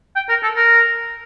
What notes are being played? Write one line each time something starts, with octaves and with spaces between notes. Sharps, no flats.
G5
A#4
A4
A#4